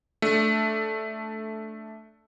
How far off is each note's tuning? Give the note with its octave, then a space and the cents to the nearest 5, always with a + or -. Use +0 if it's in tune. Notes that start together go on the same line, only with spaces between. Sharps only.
A3 -5 D4 +0